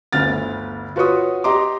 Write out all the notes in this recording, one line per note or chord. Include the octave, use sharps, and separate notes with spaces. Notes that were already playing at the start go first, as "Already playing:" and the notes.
G1 D2 F6 A6
F4 F#4 B4 C#5 C#6 D#6
G4 D#5 A#5 C6 D6